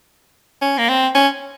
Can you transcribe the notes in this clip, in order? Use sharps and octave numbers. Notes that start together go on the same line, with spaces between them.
C#4
A#3
C4
C#4